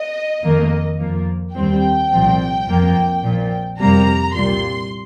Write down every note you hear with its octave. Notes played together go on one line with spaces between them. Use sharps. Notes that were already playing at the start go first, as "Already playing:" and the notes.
Already playing: D#5
F2 D#3 A#3
F2 F3 A#3
D#2 D#3 G3 C4 G5
C2 A#2 F3 C4
F2 F3 A#3
A#1 A#2 F3
F2 C3 G3 A#3 A#5
C2 A#2 G3 C6